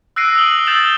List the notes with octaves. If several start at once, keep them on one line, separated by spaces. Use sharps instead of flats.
E6 F#6 A#6 C7 D7 D#7
D#6 E6 F#6 D7 F#7 G7
E6 G6 A6 E7 F7 G7